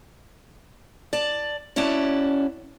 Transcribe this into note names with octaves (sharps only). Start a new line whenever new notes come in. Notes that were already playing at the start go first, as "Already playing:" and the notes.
D5 A5
F#2 C#4 E4 F#4 D5 A5